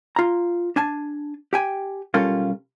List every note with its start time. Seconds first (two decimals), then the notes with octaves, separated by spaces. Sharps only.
0.16 F4 A#5
0.76 D4 G#5 A5
1.53 G4 G5 G#5
2.14 B1 G3 C#4 F4 A4 A#4